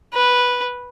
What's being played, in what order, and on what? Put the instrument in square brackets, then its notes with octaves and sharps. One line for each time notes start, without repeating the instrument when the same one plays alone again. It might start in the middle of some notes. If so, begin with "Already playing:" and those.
[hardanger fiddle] B4